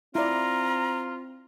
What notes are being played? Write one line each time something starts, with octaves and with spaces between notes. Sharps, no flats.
C4 E4 F4 D5 A#5